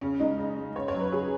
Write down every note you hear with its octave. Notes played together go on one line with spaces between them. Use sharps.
C#3 C#4
G#3 D#4
C#3
G#3
C#3 C#5
C#5
F#3
B4
C#3 G#4